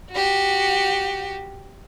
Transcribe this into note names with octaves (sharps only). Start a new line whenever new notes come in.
F#4 G4